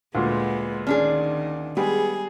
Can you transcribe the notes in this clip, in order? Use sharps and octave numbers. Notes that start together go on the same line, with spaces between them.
D2 A#2 G#3 B3
D#3 C#4 D4 G#4
G3 G#3 B3 G#4